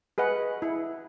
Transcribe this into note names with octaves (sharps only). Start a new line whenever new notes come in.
G#4 B4 D#5 F#5
E4